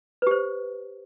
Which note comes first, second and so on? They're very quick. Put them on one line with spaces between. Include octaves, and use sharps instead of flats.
B4 G4 C5